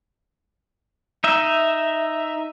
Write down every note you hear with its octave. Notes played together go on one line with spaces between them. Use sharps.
D#4 E5